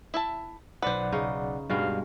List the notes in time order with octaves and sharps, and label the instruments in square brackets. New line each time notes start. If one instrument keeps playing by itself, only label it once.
[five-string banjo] E4 E5 A5
[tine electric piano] B1 D5 F#5 [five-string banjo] B4 C5
[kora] C#3 D#4
[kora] G2 B2 G#3 [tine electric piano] G3 F5 F6